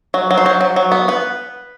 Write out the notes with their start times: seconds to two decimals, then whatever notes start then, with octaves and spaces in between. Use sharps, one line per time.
0.14 F#3
0.31 F#3
0.38 C5
0.46 F#3
0.61 F#3
0.76 F#3
0.92 B3
1.08 B3 B4